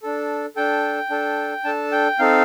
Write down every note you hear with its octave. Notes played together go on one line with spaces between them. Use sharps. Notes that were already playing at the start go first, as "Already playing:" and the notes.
D4 A4
D4 A4 G5
D4 A4
D4 A4 A5
G5
C4 D#4 A4 F5